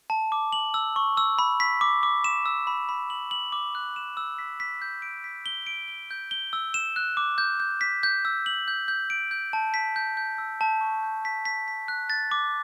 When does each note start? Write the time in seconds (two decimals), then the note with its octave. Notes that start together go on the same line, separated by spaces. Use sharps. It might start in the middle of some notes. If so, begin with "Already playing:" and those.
0.10 A5
0.32 D6
0.53 F#7
0.74 E6
0.96 C#6
1.17 E6
1.39 B5
1.60 B6
1.81 D6
2.03 D6
2.24 E7
2.46 E6
2.67 B5
2.89 B5
3.10 F#7
3.31 F#7
3.52 D6
3.75 F#6
3.96 E7
4.17 E6
4.39 B6
4.60 B6
4.82 G6
5.02 D7
5.24 B6
5.46 G7
5.67 D7
5.88 G7
6.11 G6
6.31 G7
6.53 E6
6.74 E7
6.96 F#6
7.17 D6
7.38 G6
7.60 G6
7.81 B6
8.03 G6
8.25 E6
8.46 F#7
8.68 G6
8.88 G6
9.10 D7
9.31 G6
9.53 A5
9.74 B6
9.96 G6
10.17 G6
10.38 E6
10.61 A5
10.81 C#6
11.03 G6
11.25 B6
11.45 B6
11.68 B6
11.88 F#6
12.10 A6
12.31 D6